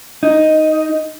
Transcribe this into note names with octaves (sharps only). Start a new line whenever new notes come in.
D#4